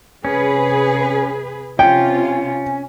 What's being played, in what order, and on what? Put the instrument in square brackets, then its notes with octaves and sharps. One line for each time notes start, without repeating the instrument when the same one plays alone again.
[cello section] C3 G#4 B4 [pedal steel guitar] C#4
[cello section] C3 F4 [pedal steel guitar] C#4 [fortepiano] G5